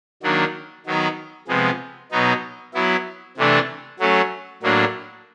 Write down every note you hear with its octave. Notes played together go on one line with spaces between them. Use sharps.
D#3 F#3 A#3 D4
D#3 F#3 B3 D#4
C3 F3 G#3 B3
B2 F#3 B3 D#4
F#3 B3 E4
C3 E3 A3 D4
F#3 A3 C#4
A2 F#3 A#3 D4